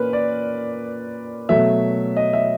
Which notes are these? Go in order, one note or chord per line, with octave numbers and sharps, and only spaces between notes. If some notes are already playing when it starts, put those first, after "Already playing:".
Already playing: A#2 C#4 A#4 B4
D5
B2 F#3 A3 E5
D#5
E5